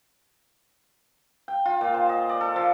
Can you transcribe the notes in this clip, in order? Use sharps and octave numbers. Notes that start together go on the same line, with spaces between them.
G5
F4
A#2
C5
D#5
D5
A4
F3